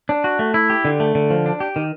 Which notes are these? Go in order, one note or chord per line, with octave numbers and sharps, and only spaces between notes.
D4
F#4
A3
E4
G4
D3
A3
D3
F3
D4
G4
D#3